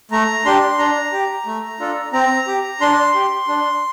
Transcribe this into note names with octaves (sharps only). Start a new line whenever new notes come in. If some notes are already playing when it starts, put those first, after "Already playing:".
A3 A#5
D4 G4 C6
D4 A#5
G4
A3
D4 F4 A4
C4 A#5
G4
D4 C6
G4
D4